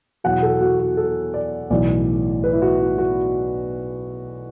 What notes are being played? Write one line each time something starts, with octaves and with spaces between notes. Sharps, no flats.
E2 B2 F#3 F#5
A4
F#4
F#4
A4
D5
B1 A2 E3 D5
B4
E4
F#4
E4
F#4